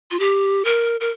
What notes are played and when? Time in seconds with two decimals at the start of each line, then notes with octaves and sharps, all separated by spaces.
0.11 F4
0.19 G4
0.65 A#4
1.00 A#4